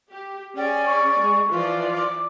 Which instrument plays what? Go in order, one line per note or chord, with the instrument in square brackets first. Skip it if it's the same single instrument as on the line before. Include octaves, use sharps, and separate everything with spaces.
[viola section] G4
[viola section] C#4 G#4 G#5 [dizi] D5 [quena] G5
[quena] C#6
[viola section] G#3 G#4
[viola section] E3 F3 D5 [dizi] F4
[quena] D6